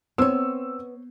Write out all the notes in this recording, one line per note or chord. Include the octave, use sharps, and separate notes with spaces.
B3 C4 C5 C#5 E6